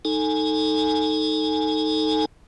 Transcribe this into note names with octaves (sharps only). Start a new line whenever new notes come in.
D#4 A4 G#5